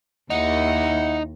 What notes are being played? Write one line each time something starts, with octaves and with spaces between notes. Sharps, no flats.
D#2 D#4 E4 F#5